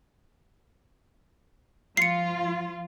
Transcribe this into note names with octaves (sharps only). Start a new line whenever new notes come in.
F3 F4 C7 C#7